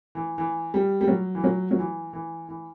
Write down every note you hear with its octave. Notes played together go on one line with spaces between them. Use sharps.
E3
E3
G3
G3
F#3
E3
F#3
F#3
E3
E3
E3